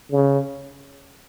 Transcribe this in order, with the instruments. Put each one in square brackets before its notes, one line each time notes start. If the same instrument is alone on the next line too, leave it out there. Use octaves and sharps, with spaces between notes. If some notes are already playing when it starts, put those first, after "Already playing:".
[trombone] C#3